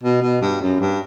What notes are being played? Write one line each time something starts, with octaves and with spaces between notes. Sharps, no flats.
B2
B2
G2
F#2
G2